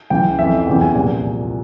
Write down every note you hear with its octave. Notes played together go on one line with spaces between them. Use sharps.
C#2 C#3 E3 G5
F2 E3 E5
E2 C#3 E3 G5
G#5
C2 A#2 F3 G#5